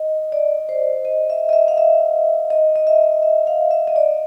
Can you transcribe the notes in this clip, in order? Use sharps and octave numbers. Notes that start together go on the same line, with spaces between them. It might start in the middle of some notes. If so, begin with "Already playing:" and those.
Already playing: D#5
D5
C5
D#5
E5
D#5
E5
F5
E5
D#5
D#5
E5
E5
F5
E5
D#5
D5